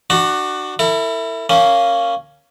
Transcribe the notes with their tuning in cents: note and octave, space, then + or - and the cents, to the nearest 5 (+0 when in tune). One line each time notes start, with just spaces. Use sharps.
D4 +30 F#4 +10 C#6 -20
E4 +0 A4 +45
A#3 -10 C#4 +0